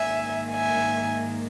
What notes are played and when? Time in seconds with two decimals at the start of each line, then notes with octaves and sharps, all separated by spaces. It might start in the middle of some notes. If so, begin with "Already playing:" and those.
Already playing: G#2 D#3 A#3 E5 G#5
0.52 E5 G#5